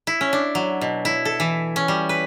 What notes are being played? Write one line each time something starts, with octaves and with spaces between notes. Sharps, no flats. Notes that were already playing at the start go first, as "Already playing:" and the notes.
E4
C#4
D4
F#3
B2
E4
A4
E3
C#4
G3
B4